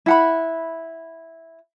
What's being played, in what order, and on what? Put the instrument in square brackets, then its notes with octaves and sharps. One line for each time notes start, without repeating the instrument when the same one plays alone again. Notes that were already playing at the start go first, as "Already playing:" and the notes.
[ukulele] E4 F#5 B5